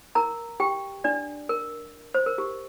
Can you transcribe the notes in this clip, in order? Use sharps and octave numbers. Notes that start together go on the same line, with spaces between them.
A#4 A#5
G4 G5
D4 D5
A#4
C5
A#4
G4